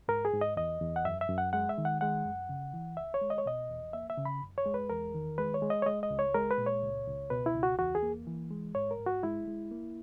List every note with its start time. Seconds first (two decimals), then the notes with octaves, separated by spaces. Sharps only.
0.08 G#2 A#4
0.25 G#4
0.33 G#2
0.41 D#5
0.57 E2 D#5
0.81 E2
0.96 F#5
1.05 F#2 E5
1.21 E5
1.29 F#2
1.38 F#5
1.53 G#3 F#5
1.69 E5
1.78 D#3
1.85 F#5
2.01 G#3 F#5
2.25 F#2
2.49 C#3
2.74 E3
2.97 C#2 E5
3.14 C#5
3.21 G#3
3.30 D#5
3.38 C#5
3.46 B2 D#5
3.70 E2
3.93 A#3 E5
4.10 E5
4.17 C#3
4.25 B5
4.42 F#2
4.58 C#5
4.66 G#3
4.74 B4
4.90 E2 A#4
5.14 D#3
5.38 G#3 B4
5.54 C#5
5.62 G#3
5.70 D#5
5.82 C#5
5.86 G#3 D#5
6.03 D#5
6.11 C#2
6.19 C#5
6.35 G#3 A#4
6.51 B4
6.58 A#2
6.66 C#5
6.82 C#2
7.07 C#2
7.30 B2 B4
7.46 E4
7.55 C#2
7.63 F#4
7.79 E2 F#4
7.95 G#4
8.03 A#3
8.27 E3
8.51 G#3
8.75 G#2 C#5
8.91 A#4
9.00 G#2
9.07 F#4
9.23 G#3 E4
9.47 G#3
9.71 A#3